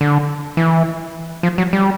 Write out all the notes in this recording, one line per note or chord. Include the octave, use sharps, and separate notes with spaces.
D3
E3
F3
F#3
G3